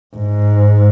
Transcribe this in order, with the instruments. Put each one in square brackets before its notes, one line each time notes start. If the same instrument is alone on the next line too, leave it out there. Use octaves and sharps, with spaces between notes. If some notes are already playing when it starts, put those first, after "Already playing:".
[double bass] G#2